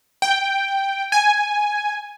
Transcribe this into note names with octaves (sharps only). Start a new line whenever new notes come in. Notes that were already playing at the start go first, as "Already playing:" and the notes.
G5
G#5